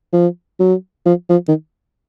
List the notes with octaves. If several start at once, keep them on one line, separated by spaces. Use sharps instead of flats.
F3
F#3
F3
F3
D#3